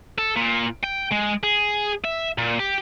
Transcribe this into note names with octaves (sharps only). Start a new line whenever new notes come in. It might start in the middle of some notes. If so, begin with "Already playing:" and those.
A4
A#2
G5
G#3
G#4
E5
A#2
G4